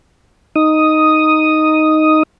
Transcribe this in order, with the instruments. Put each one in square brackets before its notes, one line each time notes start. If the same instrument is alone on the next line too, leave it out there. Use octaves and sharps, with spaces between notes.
[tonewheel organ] D#4 D#6